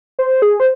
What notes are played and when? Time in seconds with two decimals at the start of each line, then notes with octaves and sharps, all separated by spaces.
0.19 C5
0.42 G#4
0.60 C5